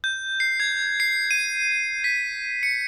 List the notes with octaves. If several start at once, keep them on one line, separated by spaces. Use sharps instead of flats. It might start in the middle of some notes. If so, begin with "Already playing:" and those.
G6
C7
G#6
C7
D#7
B6
C#7